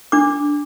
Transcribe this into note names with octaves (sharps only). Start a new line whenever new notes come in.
D4 D6